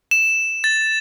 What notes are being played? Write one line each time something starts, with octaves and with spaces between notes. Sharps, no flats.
E7
A6